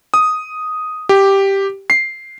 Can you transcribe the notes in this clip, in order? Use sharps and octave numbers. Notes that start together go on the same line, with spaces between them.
D#6
G4
C7